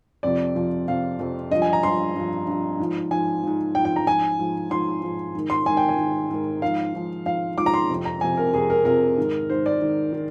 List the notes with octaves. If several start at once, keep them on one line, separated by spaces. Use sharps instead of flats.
F2 C3 F3 D5
F2 C3 F3
F2 C3 F3 F5
F2 C3 F3
G2 F3 D#5
G#5
A#5
G2 F3 C6
G2 F3
G2 F3
G#2 F3
G#2 F3 G#5
G#2 F3
G#2 F3 G5
G5
A#5
G#2 F3 G#5
G#2 F3
G#2 F3 C6
G#2 F3
G#2 D#3
C6
G#2 D#3 G#5
G5
G#5
G#2 D#3
G#2 D#3
G#2 F3 F5
G#2 F3
G#2 F3 F5
G#2 F3 D6
A#5
C6
F2 C3 F3
A#5
F2 C3 F3 G#5
A#4
F2 C3 F3 G#4
A#4
F2 C3 F3 A#4
G#2 D#3
G#2 D#3 C5
D5
G#2 D#3
D#3